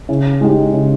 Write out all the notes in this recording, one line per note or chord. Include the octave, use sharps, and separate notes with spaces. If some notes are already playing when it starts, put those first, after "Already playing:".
C#3
G#3 D#4 G4
C#3